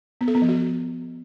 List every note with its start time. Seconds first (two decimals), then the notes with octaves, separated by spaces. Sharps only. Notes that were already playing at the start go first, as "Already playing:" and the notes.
0.21 B3
0.28 A4
0.35 B3
0.42 F3
0.49 F#4